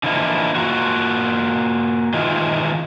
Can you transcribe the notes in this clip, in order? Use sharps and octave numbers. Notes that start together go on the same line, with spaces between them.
D3 E3 F3 A#3 D#4 E4
A#3 F4 F#4
D#3 E3 G#3 F4